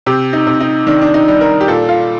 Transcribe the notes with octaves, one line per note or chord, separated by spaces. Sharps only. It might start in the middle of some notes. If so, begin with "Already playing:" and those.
C3 G4
D#4
C3
D#4
D#3 D4
D4
D#4
G3
A#4
G4
A#2 A4
F4